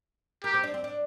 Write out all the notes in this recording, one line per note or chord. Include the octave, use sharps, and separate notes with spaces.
G4 A#4
C4
D4
C4
D4